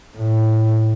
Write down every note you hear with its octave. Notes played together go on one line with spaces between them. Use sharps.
A2